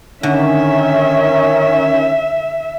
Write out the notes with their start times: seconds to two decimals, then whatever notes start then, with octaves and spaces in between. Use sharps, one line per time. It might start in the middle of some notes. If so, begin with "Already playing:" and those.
0.23 D3 D#3 C#4 E5